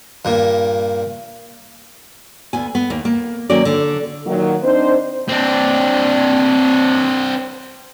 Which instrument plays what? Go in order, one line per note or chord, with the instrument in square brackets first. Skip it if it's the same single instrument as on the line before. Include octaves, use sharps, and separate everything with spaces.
[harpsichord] G2 A#2
[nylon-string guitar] D2 B3 G#5
B3
D#2 A#3
A#3
D#3 F#3 A#3 C#4 A#4 D5
D3
[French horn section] A#2 D#3 F#3
C4 D4 D#4 C5
[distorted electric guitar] C4 D4